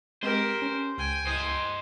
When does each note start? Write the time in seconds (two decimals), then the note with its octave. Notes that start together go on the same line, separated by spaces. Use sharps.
0.23 G#3 C4 G4 A#4 C5
0.62 C#4
0.98 C#2 G5 G#5
1.27 C5 D#5